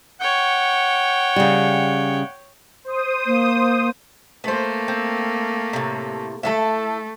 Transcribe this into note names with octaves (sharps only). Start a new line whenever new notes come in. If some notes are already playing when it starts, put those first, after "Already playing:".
C#5 F#5 G5
C#3 G3
C5 D#6
A#3
A3 A#3 B4 C5
C4
A2 C3
A3 E4 F4 A4